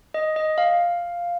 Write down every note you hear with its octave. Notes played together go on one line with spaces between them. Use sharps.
D#5
D#5
F5